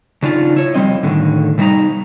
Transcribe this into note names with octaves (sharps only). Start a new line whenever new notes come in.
C#3 D4 D#4 F4
E4 C#5
F2 C3 G3 C4 D#5
A2 D3 D#3
C3 G3 D4 D#4 A#5